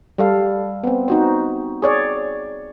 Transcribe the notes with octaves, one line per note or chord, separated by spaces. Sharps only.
G3 A4 F5
B3 C4
D#4 F#4 C5
G#4 C#5 D5